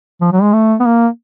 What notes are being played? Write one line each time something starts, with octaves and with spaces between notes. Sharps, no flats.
F3
F#3
G#3
A3
B3
A#3